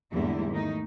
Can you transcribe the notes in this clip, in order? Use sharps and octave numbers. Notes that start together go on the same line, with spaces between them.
E2 G#2 D3 G3 A#3 E4
D#3 A3 D#4